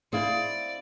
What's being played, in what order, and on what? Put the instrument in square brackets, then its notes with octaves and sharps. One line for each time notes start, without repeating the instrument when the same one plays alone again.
[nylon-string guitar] C4 E4 [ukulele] G#4 C5 F5 [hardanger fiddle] D5